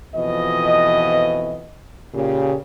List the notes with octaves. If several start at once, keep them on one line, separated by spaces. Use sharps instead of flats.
F2 B2 E3 F3 D#5
A#2 C#3 G4